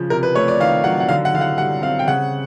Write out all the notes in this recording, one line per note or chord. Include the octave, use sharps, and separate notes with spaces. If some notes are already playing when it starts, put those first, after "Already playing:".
Already playing: C#3 F3
C3 A#4
B4
A3 C#5
D5
D#3 F5
F#3 F#5
F#5
D3 F5
F#5
D3 F5
F#5
G3 F#5
C4 F5
G5
C#3 F#5